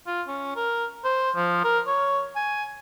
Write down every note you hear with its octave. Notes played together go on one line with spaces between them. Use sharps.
F4
C#4
A#4
C5
F3
A#4
C#5
G#5